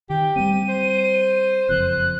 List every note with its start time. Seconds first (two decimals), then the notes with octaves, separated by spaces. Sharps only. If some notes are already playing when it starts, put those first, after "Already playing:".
0.10 D#3 G4 G5
0.36 G3 A3 C4 D#7
0.69 C5
1.69 F#1 F2 F#6